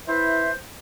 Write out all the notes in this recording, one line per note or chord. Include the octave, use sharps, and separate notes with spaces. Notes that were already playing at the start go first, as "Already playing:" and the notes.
E4 B4 C5 E5